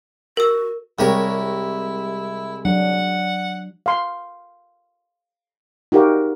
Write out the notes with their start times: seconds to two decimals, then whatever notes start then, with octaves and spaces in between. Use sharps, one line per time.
0.37 F#4 A#4 E6
0.99 C2 G#3 E4 G4 A#4 C#5 C#6
2.65 F#3 D4 F#5
3.86 F5 C6
5.92 D#4 F#4 G4 A#4 F5